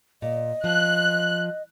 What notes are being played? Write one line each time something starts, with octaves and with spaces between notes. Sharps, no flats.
A#2 D#5
F3 F#6